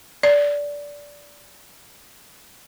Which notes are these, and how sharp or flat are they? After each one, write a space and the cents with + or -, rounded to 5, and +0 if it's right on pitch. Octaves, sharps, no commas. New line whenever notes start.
D5 -15